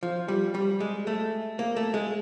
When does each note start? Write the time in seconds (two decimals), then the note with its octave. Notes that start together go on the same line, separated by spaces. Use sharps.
0.03 F3
0.28 G3
0.55 G3
0.80 G#3
1.07 A3
1.59 A#3
1.76 A3
1.94 G#3